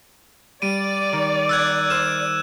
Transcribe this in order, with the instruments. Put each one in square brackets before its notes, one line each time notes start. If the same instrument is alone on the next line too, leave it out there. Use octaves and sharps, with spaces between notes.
[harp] G3 [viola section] D5 [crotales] D7 D#7
[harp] D#3
[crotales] E6 F#6 G#6
[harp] C5 F6 [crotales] E7